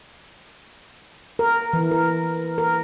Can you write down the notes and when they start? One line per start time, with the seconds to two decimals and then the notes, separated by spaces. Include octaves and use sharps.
1.39 A#4
1.73 E3
1.91 A#4
2.58 A#4